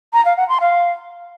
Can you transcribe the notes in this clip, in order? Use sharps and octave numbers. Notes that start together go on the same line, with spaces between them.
A#5
F5
F#5
C6
F5